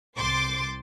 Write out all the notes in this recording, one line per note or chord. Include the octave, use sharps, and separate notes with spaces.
C2 C5 C6 D6 A6